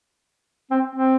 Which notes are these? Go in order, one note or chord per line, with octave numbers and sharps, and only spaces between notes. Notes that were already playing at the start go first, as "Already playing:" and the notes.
C4
C4